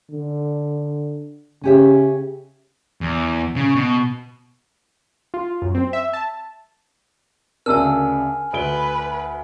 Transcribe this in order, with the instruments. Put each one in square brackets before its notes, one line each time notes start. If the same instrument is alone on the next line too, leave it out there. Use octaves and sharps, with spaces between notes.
[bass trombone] D3
[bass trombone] C#3 [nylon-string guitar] C#4 G4 E5
[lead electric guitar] E2
C#3
B2
[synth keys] F4
F#2
C4
E5
A5
[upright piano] D2 C#3 D4 [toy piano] A#4 A5 E6 [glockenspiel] G#5 F6
[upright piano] D2 D7 G7 [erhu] B4